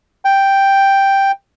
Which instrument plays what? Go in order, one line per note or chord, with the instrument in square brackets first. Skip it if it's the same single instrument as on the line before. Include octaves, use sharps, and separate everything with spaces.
[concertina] G5